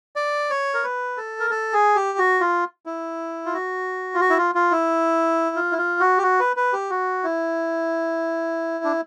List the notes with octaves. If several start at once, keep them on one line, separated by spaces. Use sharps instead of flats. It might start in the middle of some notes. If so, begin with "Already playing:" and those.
D5
C#5
A#4
B4
A4
A#4
A4
G#4
G4
F#4
F4
E4
F4
F#4
F4
F#4
E4
F4
F4
E4
F4
E4
F4
F#4
G4
F#4
B4
B4
G4
F#4
E4
D4